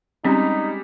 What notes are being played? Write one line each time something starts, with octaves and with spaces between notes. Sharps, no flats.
G3 G#3 C4 C#4 D#4